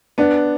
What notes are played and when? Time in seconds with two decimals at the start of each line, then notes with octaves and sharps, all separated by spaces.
0.18 B3 D4